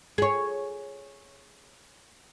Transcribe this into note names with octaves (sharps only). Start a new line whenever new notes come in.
G#4 C#5